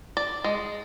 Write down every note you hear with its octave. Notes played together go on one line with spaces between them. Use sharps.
D5
G#3